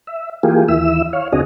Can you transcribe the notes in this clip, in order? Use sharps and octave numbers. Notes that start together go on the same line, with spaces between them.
E5
E3 A#3 F4 G4 G#4
D#2 E3 E4 E5 E6
C#5 F5
D2 C4 D4 F#4 G#4 D#5